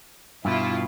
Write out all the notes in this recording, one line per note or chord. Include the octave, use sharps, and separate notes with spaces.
G2 B2 E4 F4